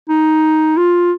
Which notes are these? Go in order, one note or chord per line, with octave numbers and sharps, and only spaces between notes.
D#4
F4